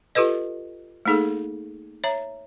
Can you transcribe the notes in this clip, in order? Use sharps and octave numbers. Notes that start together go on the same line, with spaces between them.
F4 G4 A4 B4 D#5
A3 A#3 D#4 G#4 A4
C#5 E5 A#5